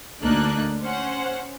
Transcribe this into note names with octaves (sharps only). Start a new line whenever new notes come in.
D2 A#3 D4 D#4 F#6
C#4 C5 F#5